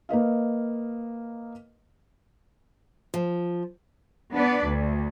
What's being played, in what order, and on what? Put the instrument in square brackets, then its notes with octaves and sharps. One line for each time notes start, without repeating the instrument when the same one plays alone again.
[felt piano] A#3 B4 D#5 F5
[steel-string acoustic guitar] F3
[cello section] B3 D4 B4 D5
D2